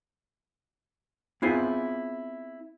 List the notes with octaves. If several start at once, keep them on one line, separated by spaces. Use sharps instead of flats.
B3 C4 E4 F4 G#4